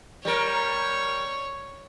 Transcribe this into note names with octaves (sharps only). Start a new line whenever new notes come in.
G3 A#4 C#5